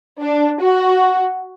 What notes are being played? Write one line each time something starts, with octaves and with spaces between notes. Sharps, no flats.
D4
F#4